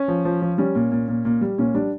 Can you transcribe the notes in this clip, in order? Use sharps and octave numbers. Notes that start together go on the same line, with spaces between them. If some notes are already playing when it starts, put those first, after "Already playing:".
Already playing: C#4
F3
F3
F3
G3 C#4
A#2
A#2
A#2
A#2
G3
A#2 C#4
G3 D4